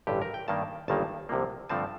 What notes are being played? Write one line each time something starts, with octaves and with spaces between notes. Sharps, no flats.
A1 G2 D3 G4
A#4
G5
G2 D#3 A#3 A5
G1 G2 D#3 A#3 A5
C2 C3 F3 A#3
G2 D3 F3 A3 C4 A5